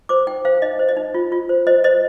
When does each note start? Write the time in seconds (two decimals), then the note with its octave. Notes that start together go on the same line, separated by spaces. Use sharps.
0.09 C5 D6
0.27 D#4 G5
0.45 C5 F5
0.62 D#4 D#5
0.79 C5
0.89 D#5
0.97 D#4
1.14 F4
1.32 F4
1.49 C5
1.67 C5 D#5
1.84 C5 D#5